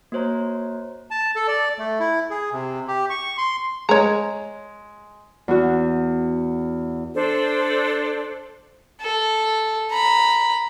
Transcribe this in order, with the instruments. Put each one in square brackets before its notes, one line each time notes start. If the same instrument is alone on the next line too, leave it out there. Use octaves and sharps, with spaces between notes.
[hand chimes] A#3 F#4 C5 C#5 A#5
[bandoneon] A5
A4
D5
A3
E4
G#4
C3
G4
C#6
C6
[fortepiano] G#3 [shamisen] C#5 A#5
[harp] E2 F#4
[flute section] D4 A4 C5
[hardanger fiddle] A4
A#5 B5